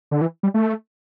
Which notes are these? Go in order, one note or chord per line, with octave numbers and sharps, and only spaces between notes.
D3
E3
G3
A3